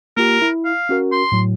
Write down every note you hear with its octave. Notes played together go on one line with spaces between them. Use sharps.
A#3 F4 G4 A#4
E4
F5
C#4 F#4 A#4
C6
A2 F#3